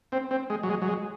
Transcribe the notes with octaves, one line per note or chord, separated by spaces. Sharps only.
C4
C4
G#3
F#3
G#3
F#3
G#3